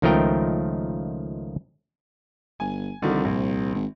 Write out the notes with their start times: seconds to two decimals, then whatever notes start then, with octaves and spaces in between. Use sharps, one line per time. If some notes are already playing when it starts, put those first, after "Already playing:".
0.02 C#2 D#3 F3 A3 A#4 G5
2.60 G1 G#5
3.02 C2 D3 D#3 F3
3.25 A#1
3.75 G#1